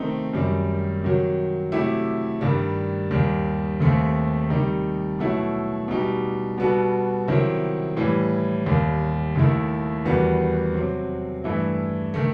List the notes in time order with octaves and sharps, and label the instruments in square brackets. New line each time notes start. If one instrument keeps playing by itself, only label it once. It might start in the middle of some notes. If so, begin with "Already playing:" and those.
Already playing: [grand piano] C3 D#3 A3 C4 D#4
F#2 D#3 G3
C3 D#3 F#3
C3 F#3 A3 E4 G4
G2 D#3 G3
D#2 D#3 G3
D#2 D#3 A3 C4
C3 D#3 G3 D#4
B2 F#3 A3 E4
B2 G3 D#4 G4
B2 G3 B3 F#4 A4
C3 D#3 F#3 C4 E4
A2 E3 G3
D#2 D#3 G3
D#2 D#3 A3 E4
E2 D#3 G3 B3 F#4
C3 F#3 C4
G2 E3 A3 E4
D#3 A3